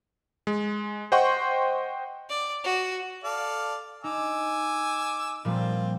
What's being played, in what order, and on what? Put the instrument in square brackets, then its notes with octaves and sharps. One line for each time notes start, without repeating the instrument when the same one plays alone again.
[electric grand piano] G#3
C5 D#5 F#5 G5 C6 C#6
[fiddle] D5
F#4
[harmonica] A4 D5 F5
[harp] D#4 [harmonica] G#5 D6 E6
[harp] A#2 F3 G3 [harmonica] C4 F4